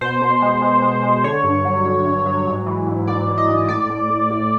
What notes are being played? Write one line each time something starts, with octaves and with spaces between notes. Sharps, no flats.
B2 C5
B2
G#3
G#3
G#3
G#3
D3 C#5
G2
F#3
D3
G2
F#3
G#2
E3
G#2
G#2 D5
E3
D#5
G#2
A2 D5
A2
A2
A2